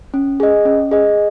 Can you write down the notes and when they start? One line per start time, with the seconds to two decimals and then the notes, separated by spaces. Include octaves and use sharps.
0.14 C#4
0.40 G#4 D#5
0.65 C#4
0.91 G#4 D#5